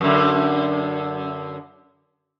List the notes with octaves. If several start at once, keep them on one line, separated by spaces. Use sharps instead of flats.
F#2 D3